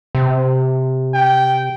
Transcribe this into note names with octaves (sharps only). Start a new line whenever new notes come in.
C3
G5